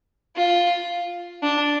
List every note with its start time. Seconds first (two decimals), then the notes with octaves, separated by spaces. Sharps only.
0.36 F4
1.43 D4